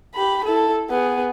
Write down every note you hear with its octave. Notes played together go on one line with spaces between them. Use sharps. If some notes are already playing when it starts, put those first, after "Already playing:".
G4 B5
E4 A4
B3 G#4